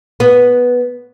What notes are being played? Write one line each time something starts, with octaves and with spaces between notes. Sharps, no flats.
B3